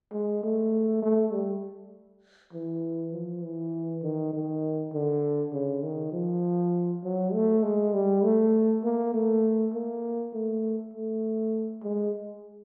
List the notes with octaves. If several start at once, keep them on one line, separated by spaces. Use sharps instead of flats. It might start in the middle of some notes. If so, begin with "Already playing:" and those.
G#3
A3
A3
G3
E3
F3
E3
D#3
D#3
D3
C#3
D#3
F3
F#3
A3
G#3
G3
A3
A#3
A3
A#3
A3
A3
G#3